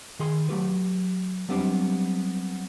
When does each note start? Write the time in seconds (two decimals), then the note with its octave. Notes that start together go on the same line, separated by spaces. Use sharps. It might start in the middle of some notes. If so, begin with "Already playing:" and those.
0.19 D#3 G#4 C6
0.49 F#3 A3 G4 B4
1.49 F#3 G3 B3 C4 D4 G4